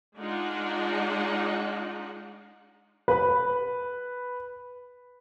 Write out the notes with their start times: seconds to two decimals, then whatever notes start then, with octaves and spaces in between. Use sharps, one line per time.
0.18 G#3 D4 D#4 F4 F#5
3.08 B4 B5